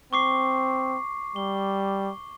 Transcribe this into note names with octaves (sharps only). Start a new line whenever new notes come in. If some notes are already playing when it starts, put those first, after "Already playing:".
C4 C#6 D6 C7
G3 G7